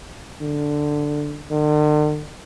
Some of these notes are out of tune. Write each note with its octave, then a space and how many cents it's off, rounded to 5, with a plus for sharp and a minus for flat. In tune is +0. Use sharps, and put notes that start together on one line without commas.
D3 +5
D3 +45